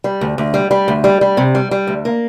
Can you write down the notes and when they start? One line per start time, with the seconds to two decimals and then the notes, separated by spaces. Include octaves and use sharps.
0.04 G3
0.21 D2
0.38 D2
0.54 G3
0.71 G3
0.88 D2
1.04 G3
1.21 G3
1.37 C3
1.55 G3
1.71 G3
1.87 D2
2.05 A#3